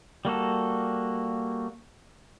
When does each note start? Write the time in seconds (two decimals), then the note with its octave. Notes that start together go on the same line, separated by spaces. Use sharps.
0.25 G3 A#3 F#4 A4